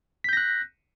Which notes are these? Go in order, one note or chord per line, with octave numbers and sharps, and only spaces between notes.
F#6 G6 A#6 B6